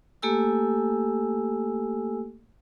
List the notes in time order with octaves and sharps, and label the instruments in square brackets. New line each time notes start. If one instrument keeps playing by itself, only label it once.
[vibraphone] A3 A#3 G4 A4 G#5 E6